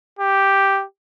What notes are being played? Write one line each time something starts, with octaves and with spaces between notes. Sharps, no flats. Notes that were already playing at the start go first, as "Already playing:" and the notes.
G4